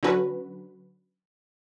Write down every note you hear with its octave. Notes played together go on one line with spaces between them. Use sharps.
D3 F#3 C#4 F#4 B4